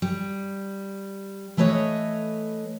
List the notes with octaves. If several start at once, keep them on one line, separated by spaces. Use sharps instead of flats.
G3
E3 A3 B4 C#5 D#5